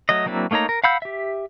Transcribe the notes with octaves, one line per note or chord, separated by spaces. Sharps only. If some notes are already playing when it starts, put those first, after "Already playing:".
F#3 A3 D#5
F#3 A#3 C4 D4 E4
A3 A#3 D#4 C#5 A#5
A#4
F5 F#5 B5 E6 G6
G4 E5